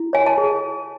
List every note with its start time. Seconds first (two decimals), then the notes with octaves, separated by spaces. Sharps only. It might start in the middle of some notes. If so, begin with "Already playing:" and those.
Already playing: E4
0.13 C#5 G#5
0.26 A5
0.38 G#4